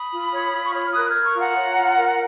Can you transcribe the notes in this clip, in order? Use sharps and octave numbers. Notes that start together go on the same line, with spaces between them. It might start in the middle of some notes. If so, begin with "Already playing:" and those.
Already playing: B5 D#6
F4
C#5
F4
C#6
C#5 D#6
F6
A#4 D#6 F#6
F#6
A#4 F6 G#6
A#5 C#6
F4
F#5 A#5
C#5
F4
A#4